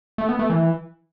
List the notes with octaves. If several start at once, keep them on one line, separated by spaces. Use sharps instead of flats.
A3
B3
A3
E3